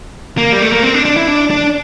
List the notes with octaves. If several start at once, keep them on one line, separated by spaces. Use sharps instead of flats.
A#3
G3
A3
A#3
C4
D4
D4
E4
D4
D4